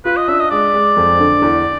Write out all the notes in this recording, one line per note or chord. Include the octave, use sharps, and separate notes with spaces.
F4 B4
D#5
D4 E5
D#5
G#3 D5
G#3
F2
D3
E2